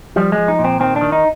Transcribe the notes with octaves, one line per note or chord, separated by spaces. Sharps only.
F3 G3
G#3
F3
D#4
A#2
C4
D#3 C4
D4
D#3
D#4